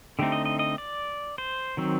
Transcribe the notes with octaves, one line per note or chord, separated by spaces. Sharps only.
D3 A3 C4 D#4 G4
D#5
D#5
D#5
D5
C5
D#3 F#3 C4